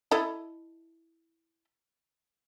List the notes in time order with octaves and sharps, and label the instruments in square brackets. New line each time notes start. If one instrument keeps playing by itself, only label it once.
[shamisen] E4 A4 D#5